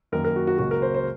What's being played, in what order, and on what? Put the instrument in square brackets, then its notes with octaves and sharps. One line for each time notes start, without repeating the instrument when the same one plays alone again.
[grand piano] F#2 D#3 A#3 A#4
A#4
F#4
F#4
C#2 C#3 F#3 A#3 F#4
A#4
C5
C5